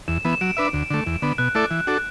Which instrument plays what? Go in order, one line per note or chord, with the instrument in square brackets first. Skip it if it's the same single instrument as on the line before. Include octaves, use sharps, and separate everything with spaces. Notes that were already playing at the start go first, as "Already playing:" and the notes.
[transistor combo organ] E2 [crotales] E7
[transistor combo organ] E3 B3
[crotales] E7
[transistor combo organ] F#3 [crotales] D7
[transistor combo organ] D4 B4 E5
D2
D3 A3
E2
D3 B3
[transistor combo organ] B2 [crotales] F#6
[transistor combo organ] A3 E4 A4 D5
E3
D4 F#4 A4